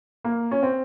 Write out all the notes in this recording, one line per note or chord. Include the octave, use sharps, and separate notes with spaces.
A#3
C#4
C4